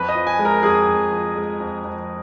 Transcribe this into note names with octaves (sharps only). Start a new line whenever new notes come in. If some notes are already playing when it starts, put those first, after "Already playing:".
Already playing: F2 B4
D#5
F3
G#5
G#3
A#4
F2 G#4
F2
F3
G#3
F2
F2